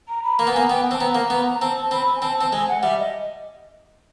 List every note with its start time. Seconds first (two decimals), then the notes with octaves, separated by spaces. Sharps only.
0.09 A#5
0.24 B5
0.39 A#3 A#5
0.47 B3
0.54 A#3 G#5
0.70 B3 G5
0.85 G5
0.91 C4 A5
0.99 B3 A#5
1.15 A#3
1.30 B3
1.61 C4 A5
1.76 A5
1.91 C4 B5
2.16 G#5
2.22 C4 A5
2.38 C4 A5
2.52 G#3 G#5
2.68 F#5
2.83 G3 E5
2.98 D#5